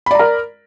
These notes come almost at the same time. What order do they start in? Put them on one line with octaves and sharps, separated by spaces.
B5 D5 A#5 A#4